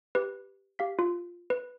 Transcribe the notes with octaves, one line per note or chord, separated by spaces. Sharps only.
G4 B4
G4 F5 B6
F4
B4